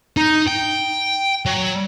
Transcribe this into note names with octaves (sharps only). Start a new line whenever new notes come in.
D#4
G5
F#3